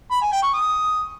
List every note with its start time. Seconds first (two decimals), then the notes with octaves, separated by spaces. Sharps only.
0.11 B5
0.22 G#5
0.32 G5
0.43 C#6
0.54 D#6